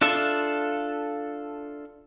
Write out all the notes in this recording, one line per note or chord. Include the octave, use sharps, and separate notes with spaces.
D4 F4 A4 E5